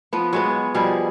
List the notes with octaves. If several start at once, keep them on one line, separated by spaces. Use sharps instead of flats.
F3 B3
F#3 G#3 B3
B2 F3 G3 G#4